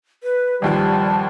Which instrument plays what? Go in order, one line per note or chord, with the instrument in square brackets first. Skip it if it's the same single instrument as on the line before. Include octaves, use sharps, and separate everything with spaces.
[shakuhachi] B4
[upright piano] G#1 D#2 F3 [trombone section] G3 [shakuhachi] A5